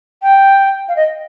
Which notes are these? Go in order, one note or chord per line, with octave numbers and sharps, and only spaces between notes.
G5
F5
D#5